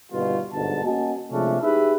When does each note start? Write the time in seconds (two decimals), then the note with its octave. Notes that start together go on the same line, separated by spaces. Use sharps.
0.12 G1 D#2 B2 G3 A3 F4
0.53 G1 D2 G#2 B2 A5
0.84 A#3 C#4 F#4 D#5 G#5 A5
1.31 C3 F3 G#3 A3 C#4 D4
1.62 D#4 E4 G4 G#4 B4 E5